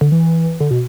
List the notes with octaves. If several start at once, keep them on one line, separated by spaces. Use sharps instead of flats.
D3
E3
D3
B2